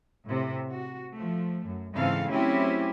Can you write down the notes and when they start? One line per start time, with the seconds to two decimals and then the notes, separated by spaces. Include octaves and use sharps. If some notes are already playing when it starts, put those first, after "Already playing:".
0.25 A2 C3
0.69 F#4
1.13 F3 A3
1.65 F#2
1.94 G#2 C#3 E3 C4 A4 F5
2.30 F#3 A3 C4 C#4 E4 G4